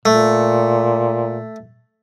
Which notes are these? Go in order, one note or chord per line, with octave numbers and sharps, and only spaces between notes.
A#2 A3